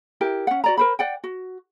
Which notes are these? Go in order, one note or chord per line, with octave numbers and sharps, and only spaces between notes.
E4 G4 A#4
C#4 F#5
F#4 D5 A#5
A#4 C5 B5
D5 F#5 G5
F#4